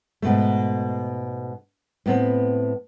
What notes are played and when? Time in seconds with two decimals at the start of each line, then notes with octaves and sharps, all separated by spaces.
0.22 G#2 B2 A3
2.06 A2 B3 C4